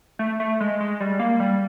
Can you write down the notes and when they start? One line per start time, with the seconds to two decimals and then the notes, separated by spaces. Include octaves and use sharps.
0.19 A3
0.40 A3
0.60 G#3
0.80 G#3
1.00 G3
1.19 A#3
1.40 G3